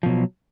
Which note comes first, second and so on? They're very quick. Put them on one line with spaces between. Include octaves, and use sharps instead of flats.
F3 B2 F#3